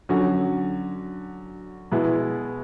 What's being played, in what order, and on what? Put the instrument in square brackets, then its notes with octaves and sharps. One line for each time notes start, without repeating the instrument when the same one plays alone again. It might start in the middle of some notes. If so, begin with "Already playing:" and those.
[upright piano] D3 F#3 C#4 F#4
B2 G#3 B3 E4